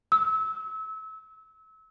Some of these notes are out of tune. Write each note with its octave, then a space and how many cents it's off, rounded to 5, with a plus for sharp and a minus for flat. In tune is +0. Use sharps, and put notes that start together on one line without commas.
E6 -30